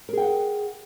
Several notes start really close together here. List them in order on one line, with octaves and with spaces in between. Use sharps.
A#4 G#4 G5 F#5